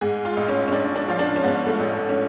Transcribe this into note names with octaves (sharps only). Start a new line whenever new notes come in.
G#2 G#4
F4
A1
C#4
C#4
A1 D4
D4
F3 F4
D4
C#4
G#2 B3
A3
A1
C#4